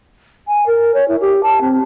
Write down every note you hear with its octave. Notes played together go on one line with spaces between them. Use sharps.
G#5
A#4
C#5
E4
G4
A5
C4